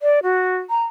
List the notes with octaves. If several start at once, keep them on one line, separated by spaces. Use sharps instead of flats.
D5
F#4
A#5